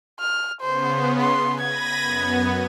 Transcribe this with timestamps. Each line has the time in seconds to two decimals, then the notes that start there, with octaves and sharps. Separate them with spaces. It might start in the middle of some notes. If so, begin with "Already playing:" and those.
0.20 F6
0.61 C#3 B3 C5
1.21 C6
1.61 B5 G#6 A#6 D#7
2.02 F#2 B3